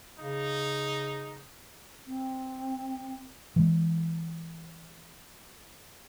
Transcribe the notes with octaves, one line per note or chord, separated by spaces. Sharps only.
C#3 D#4
C4
E3 G#3